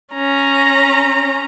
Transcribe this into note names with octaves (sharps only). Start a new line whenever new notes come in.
C#4 A#5